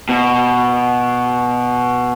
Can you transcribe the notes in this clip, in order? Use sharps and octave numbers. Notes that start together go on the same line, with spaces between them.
B2